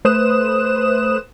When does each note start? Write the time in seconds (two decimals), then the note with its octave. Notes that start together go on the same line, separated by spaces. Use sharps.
0.05 A3 B4 C5 D#6 F#6 E7